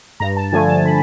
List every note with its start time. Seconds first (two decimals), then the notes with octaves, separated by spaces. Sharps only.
0.20 G2 A#5
0.37 A5
0.52 D3 F3 A3 G#5
0.69 A5
0.85 B5